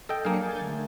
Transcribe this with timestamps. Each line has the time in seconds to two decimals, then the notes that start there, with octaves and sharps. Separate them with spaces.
0.09 A4 D#5 G5
0.25 F#3 A#3 D4 G#4 F5 C#7
0.42 G#5 G6 A6
0.61 D3 A3